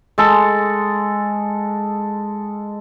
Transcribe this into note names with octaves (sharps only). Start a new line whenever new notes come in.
G#3 A4